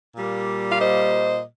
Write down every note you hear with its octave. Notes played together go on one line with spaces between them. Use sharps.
A#2 G3 A#3
F5
C5 D#5